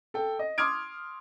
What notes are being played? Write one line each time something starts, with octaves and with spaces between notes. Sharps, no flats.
A4 G5
D#5
C6 D6 D#6 F6 G#6 D7